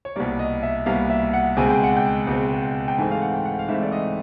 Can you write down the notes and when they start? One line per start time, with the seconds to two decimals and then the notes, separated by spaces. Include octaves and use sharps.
0.05 C#5
0.16 C2 B2 G3 A#3 D5
0.39 D#5
0.63 E5
0.86 C2 B2 G3 A#3 F5
1.10 E5
1.33 F#5
1.57 C#2 B2 G#3 C4 G#5
1.70 G5
1.84 F#5
1.97 G5
2.27 C#2 B2 G#3 C4
2.88 G5
2.98 G#2 E3 A3 C4 G#5
3.11 F5
3.22 F#5
3.34 G5
3.45 F#5
3.59 F5
3.68 G#2 E3 A3 C4 E5
3.82 D5
3.92 D#5